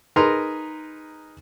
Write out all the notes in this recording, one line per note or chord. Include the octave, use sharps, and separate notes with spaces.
D#4 G#4 A#4 B4 A#5 C6